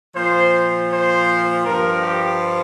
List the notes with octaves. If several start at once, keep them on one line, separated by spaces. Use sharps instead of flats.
A#2 F3 C5
C5
G2 F3 A#4
G4